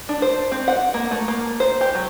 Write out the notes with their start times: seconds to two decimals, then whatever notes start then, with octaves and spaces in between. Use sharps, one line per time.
0.09 D4
0.22 C5
0.52 C4
0.68 F#5
0.94 A#3
1.11 A3
1.28 A#3
1.60 C5
1.81 G4
1.95 F#3